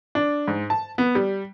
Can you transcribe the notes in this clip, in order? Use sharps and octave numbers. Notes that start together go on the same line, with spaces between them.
D4
G#2
A5
B3
G3